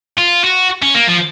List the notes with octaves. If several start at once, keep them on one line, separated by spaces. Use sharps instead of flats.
F4
F#4
C#4
A#3
F3